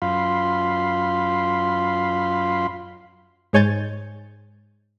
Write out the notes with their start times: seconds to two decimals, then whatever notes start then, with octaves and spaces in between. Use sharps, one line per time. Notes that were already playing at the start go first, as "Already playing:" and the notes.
0.02 F#2 F4 F5 B5 C6
3.53 G#2 G#3 C#5 G#5 G6 A6